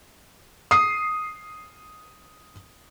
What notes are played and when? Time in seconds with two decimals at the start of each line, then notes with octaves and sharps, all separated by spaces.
0.71 D#6 C7